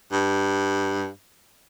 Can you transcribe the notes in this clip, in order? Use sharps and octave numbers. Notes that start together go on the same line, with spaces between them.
G2